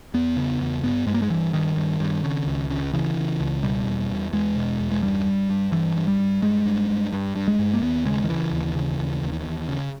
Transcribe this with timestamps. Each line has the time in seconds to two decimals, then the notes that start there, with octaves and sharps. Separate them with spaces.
0.14 E2 B3
0.37 C#3
0.60 E2
0.84 G2 B3
1.07 G2 G#3
1.14 A#3
1.22 G#3
1.30 G2 E3
1.53 G2 D#3
1.76 G2
2.00 G2
2.24 C#3
2.47 C#2
2.70 C#3
2.93 C#3 E3
3.17 C#3
3.40 C#2
3.63 B2 G3
3.87 E2
4.10 E2
4.33 E2 G#3
4.56 B2
4.79 E2
4.91 G#3
5.03 G2 G3
5.26 G2
5.50 G2
5.72 G2 E3
5.96 G2
6.08 G3
6.19 G2
6.42 G2 G#3
6.66 G2
6.89 G2
7.13 G2
7.36 G2
7.48 G#3
7.59 G2
7.73 A#3
7.82 D#2 B3
8.06 C#3 G#3
8.24 D#3
8.29 C#3 E3
8.52 D#2
8.75 C#3
8.99 D#2
9.22 D#2
9.45 D#2
9.69 C#3